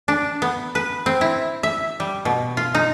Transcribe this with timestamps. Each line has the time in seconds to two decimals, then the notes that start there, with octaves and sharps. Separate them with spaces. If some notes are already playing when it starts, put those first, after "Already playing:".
0.08 D4
0.42 B3
0.75 B4
1.06 C4
1.21 E4
1.63 E5
2.00 G3
2.25 B2
2.57 F4
2.75 D#4